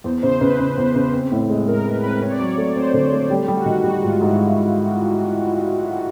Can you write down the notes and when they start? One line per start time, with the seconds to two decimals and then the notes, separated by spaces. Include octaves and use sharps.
0.04 E2 C5
0.22 C#3 C5
0.41 C#3 B4
0.59 C#3
0.78 E2
0.95 C#3
1.13 C4
1.32 A2
1.50 G#3
1.67 A2 A#4
1.85 G#3 B4
2.03 C4 B4
2.21 C4 C#5
2.31 D5
2.39 F#3 C#5
2.58 A3
2.76 C4 C5
2.94 D3
3.12 A3
3.30 G3 G4
3.48 G3
3.57 F#4
3.66 D#3
3.84 G3 F#4
4.02 G#2 F4
4.20 G#2 E4